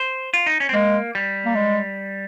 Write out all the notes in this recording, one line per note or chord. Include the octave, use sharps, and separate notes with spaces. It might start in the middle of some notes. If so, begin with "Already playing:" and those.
Already playing: C5
F4
D#4
C#4
C4
G#3 A#3
G3
A#3
G#3